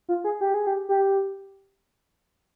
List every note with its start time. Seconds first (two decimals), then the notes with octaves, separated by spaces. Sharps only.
0.09 F4
0.24 G#4
0.41 G4
0.54 G#4
0.67 G4
0.89 G4